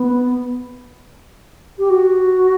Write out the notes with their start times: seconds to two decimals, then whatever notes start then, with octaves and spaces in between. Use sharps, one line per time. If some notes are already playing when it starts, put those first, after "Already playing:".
Already playing: B3
1.78 G4
1.89 F#4